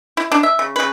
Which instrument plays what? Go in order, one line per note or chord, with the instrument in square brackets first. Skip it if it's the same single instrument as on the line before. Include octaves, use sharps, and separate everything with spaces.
[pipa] E4
D4
E5
C#3
C#3 B4